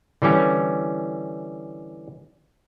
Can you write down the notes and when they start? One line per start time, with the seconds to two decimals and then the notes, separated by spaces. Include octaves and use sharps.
0.22 D3 E3 G3 C#4